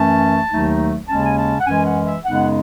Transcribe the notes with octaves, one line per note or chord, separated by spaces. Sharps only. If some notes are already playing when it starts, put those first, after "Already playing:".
Already playing: F#2 E3 A3 C#4 A5
D#2 D#3 F#3 A3 D#4
D#2 C#3 G#3 C#4 A5
G#5
A5
F#5
F#2 E3 G#3 C#4 G#5
F#5
E5
F#2 C#3 G#3 B3 D#4 F#5